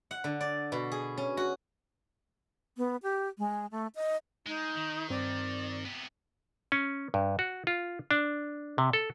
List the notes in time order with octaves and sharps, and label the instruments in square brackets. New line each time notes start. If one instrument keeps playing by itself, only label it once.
[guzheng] F#5
D3
D5
B2
G#4
C#4
F#4
[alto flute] B3
G4
G#3
A3
D#5
[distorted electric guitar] G#3 [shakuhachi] D#4
[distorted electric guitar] D#3
[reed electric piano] G2 C4 [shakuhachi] D5
[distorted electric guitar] C3 B3
[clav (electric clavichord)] C#4
G2
F#4
F4
D4
C3
A4